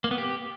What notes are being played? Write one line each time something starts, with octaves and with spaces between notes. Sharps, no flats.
A#3
B3
G4